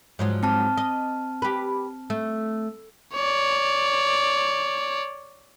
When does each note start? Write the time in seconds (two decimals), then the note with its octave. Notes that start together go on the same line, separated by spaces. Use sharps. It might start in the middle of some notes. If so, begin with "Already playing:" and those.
0.19 G#2 F3 F#3
0.43 C4 A5 F6
0.77 D#5
1.42 G4 B4
2.10 A3
3.15 C#5 D5